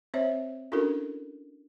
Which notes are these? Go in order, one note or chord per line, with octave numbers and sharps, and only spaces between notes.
C4 C5 C#5 E5
C#4 D4 E4 F#4 A4 A#4